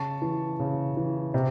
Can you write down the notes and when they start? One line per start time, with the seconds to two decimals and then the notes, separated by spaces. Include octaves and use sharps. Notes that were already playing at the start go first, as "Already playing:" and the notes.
Already playing: C#3 A5 C#6
0.22 E3
0.59 C#3
0.97 E3
1.34 C3